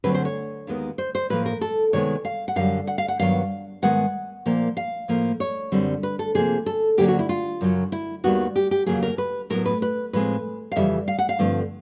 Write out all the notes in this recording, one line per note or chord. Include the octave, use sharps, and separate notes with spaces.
D2 D3 F#3 A3 C4 B4
C5
C#5
D#2 D#3 G#3 B3
C5
C5
A2 F3 A#3 B4
A#4
A4
C3 D#3 G#3 B3 C#5
F5
F#5
F#2 D3 G3 F5
F#5
F5
F#5
G2 D#3 F#3 B3 F5
G#2 D#3 G#3 B3 F#5
A#2 F3 A#3
F5
A2 F3 A#3
C#5
F#2 D3 G3 C4
B4
A4
C3 F3 A#3 G#4
A4
D2 D3 F#3 A#3 G4
F#4
E4
F4
F#2 C#3 F#3
E4
D#2 D#3 G3 B3 F#4
G4
G4
F2 C#3 F#3 A#3 G#4
A#4
B4
A2 F#3 B3 A#4
B4
B4
A2 F3 G#3 C4 B4
F5
F2 C#3 E3 G3 E5
F5
F#5
F5
G2 D3 F3 A3 C4